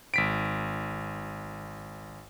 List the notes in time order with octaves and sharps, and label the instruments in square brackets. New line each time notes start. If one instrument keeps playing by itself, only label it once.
[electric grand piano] G#1 B6 D7